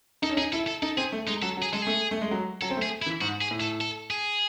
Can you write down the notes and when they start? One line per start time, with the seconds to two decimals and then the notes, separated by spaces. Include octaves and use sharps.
0.22 D#4 A4
0.30 C#4
0.37 D#4 G#4
0.53 E4 A4
0.67 A4
0.82 D#4 A4
0.97 C4 G#4
1.12 A3
1.27 G#3 D#4
1.42 F#3 A4
1.57 F#3
1.62 G#4
1.73 G#3 A4
1.82 A3 G#4
2.11 A3
2.21 G#3
2.31 F#3
2.62 F#3 A4
2.70 C4
2.77 A3
2.82 G#4
3.02 E4
3.06 E3
3.21 G#2 F#4
3.41 G#4
3.51 A2
3.61 A4
3.81 A4
4.11 G#4